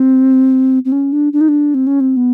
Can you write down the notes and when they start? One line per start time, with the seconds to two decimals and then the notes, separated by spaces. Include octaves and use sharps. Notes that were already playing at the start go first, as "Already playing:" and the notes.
Already playing: C4
0.85 C4
0.92 C#4
1.12 D4
1.33 D4
1.41 D#4
1.48 D4
1.74 C4
1.87 C#4
2.00 C4
2.17 B3